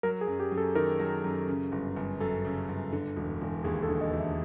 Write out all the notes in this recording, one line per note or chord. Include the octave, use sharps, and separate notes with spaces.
F#3 A#4
G#4
F#2
G4
F#2
A4
D#3 A#4
F#3
F#2
C#3
G1
G1
F#2 A4
C#3
G1
D3
E1
E1
D#2 G#4
A4
D3
D#5
E1
E5